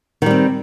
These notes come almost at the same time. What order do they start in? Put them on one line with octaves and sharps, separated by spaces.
D#3 G3 C4